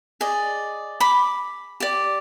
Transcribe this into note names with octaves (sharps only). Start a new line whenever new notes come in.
G#4 D5 D#5
B5 D6
G4 D5